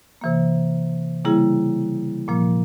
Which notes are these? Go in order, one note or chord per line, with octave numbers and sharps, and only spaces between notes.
C3 E3 A#3
C#3 G3 A#3 E4 G#4
A#2 F3 A#3